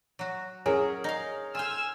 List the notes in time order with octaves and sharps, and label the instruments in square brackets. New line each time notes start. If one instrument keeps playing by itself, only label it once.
[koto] F#3 F#4
[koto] F#3 [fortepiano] C#4 G#4 A#4
[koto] D#4 F5
[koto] F4 C5 [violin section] G#5 E6 F6